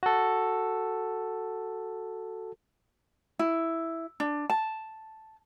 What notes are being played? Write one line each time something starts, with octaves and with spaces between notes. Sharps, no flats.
F#4 A4
E4
D4
A5